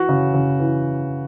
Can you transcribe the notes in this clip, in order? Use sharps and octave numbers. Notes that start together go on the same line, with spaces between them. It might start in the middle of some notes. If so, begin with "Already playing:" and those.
Already playing: E3 F#4
C#3
C#3
E3